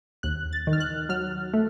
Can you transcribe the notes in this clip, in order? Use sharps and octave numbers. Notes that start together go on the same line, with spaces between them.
D#2 F#6
A6
D#3
F6
F#6
F#3 F6
A3